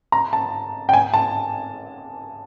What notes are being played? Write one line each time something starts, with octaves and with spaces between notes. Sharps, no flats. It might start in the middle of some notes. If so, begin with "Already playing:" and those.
A#5
A5
G5
G#5
A5